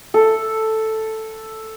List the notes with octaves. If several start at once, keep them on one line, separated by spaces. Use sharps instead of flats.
A4